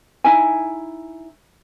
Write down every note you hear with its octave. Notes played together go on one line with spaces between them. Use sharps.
D#4 E4 G#5